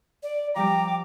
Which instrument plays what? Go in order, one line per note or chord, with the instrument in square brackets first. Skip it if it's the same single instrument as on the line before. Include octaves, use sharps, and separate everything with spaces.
[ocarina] D5
[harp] F3 G3 G4 [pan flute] G5 [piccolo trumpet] A#5 [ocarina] D6